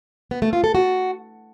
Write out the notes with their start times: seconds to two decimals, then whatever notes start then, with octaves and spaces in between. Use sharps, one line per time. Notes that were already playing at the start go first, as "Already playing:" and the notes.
0.31 B3
0.42 A3
0.53 F4
0.64 A4
0.75 F#4